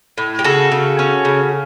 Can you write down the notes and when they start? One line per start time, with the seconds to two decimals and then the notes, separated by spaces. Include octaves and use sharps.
0.18 A2
0.39 G4
0.44 C#3 F#4 A4
0.72 C#3
0.99 C#4
1.25 C#3